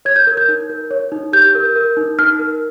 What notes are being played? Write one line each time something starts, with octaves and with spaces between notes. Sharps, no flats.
C#5 G#6
G6
A#4
G6
D#4
A#4
C#5
D#4
G4 G6
A#4
A#4
D#4
D#4 F6
A#4